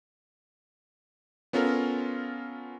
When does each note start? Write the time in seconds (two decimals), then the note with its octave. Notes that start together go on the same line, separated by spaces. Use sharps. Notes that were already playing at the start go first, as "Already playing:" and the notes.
1.53 B3 C#4 F4 A4 A#4